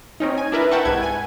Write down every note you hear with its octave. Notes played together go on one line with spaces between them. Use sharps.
C4 C#4 D#4
G#5
D4 E4 A#4 B4 E5
E5 F#5 G5 A5 C#6
C2 G#2 B4 G#6
G#5